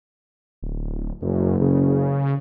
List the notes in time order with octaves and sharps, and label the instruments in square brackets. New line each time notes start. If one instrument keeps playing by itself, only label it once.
[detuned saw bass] D1
[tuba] F#1 [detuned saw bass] F#2
[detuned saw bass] C#3